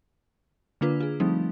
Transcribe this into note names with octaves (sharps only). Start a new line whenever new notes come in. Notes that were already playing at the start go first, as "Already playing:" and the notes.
D3 A#3 D4 F4 B4
F4 G#4
F3 G3 A3 C4 D#4